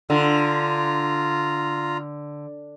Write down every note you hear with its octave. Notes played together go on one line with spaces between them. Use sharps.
D3 F4 A#5